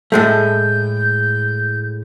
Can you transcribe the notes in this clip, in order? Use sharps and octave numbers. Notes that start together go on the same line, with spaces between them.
A2 G#3 A3 G6